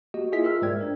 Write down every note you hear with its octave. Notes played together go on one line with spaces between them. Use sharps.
A#3 F#4 G4 D#5
E4 F4 G#4 D#5 E5 B6
F4 A#4 E5 G5 E6 F6
G#2 G#3 C5 D5 G5 G#6
D4 A#4